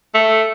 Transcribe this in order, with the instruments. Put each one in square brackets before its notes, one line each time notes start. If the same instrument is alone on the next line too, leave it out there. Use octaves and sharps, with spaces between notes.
[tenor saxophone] A3